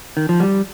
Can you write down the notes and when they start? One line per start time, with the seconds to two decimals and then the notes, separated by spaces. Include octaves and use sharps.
0.17 D#3
0.29 F3
0.40 G3